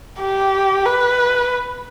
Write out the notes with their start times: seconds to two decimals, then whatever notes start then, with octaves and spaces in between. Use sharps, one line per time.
0.20 G4
0.85 B4